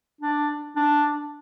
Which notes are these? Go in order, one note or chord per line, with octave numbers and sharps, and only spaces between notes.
D4
D4